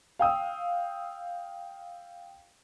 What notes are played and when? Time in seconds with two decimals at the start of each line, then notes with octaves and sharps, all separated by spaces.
0.19 F5 G5 D#6 E6